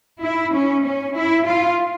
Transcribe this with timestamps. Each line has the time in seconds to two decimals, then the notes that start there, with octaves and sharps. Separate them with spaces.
0.24 E4
0.55 C#4
0.86 C#4
1.17 E4
1.48 F4